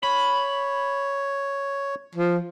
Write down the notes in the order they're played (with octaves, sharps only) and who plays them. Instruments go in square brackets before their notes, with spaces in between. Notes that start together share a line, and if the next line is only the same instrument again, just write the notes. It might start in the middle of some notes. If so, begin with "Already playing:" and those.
[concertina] C#5 [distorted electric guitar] B5
[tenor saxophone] F3